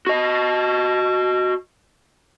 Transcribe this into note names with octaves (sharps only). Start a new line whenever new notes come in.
F#4 D#5